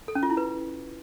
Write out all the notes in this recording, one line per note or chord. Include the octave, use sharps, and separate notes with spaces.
A4
C#4
F4
E4
B4